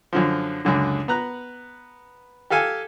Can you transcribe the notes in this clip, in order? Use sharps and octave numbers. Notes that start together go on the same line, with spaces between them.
F#2 D3 F3
C#2 F#2 D3
B3 A#5 F#6
G4 A4 F5 G#5